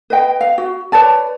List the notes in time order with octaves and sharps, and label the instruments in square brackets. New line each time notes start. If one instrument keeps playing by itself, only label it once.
[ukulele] B4 D#5 G5
F5
F#4
B4 C#5 D5 A5